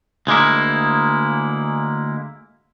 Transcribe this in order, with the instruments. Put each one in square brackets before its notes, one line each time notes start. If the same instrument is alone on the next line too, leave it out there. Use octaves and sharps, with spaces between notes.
[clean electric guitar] D2 G#3 A#3 E4